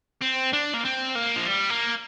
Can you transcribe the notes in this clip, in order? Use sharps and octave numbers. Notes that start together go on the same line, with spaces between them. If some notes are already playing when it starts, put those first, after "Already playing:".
C4
D4
A#3
C4
A#3
F3
G3
A#3